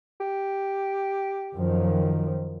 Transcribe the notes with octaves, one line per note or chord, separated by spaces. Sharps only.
G4
F#2 D#3 F3